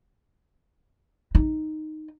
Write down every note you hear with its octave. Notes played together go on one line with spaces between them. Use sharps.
D#4